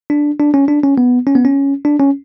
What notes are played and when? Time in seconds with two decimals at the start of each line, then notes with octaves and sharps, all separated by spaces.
0.10 D4
0.40 D4
0.54 C#4
0.68 D4
0.83 C#4
0.98 B3
1.27 C#4
1.35 B3
1.45 C#4
1.85 D4
1.99 C#4